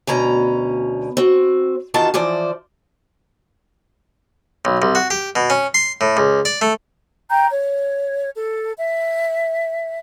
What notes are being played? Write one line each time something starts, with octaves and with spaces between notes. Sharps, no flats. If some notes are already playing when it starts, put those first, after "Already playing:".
D2 B2 C#4 A#5
C4 F#4
E2 D#3 F4 F#4 A5
E3 F3 C5 D5
B1
C2
F#4
G4
B2
C#4
C6
A2
C#2
D5
A3
G5 A#5 G6
C#5
A4
E5